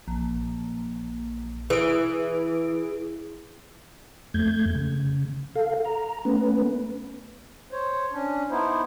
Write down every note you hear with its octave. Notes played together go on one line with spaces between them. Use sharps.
A#1
E3 G#4 D7
F2 A3 G6 G#6
C#3
A4 F5
A#5
A3 B3 C#4 B4
C5 C#5
C#4 D4
B3 D#4 E4 C5